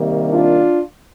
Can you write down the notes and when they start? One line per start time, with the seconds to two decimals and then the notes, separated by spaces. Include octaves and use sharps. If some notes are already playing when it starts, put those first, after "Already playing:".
Already playing: C3 D#3 G3 A#3
0.30 D4 F4